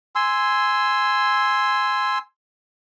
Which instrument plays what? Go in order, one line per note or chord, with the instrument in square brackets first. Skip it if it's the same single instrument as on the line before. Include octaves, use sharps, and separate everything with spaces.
[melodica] G#5 C6 E6